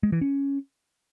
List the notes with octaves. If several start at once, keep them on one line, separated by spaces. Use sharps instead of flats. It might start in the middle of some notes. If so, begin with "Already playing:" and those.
G#3
E3
C#4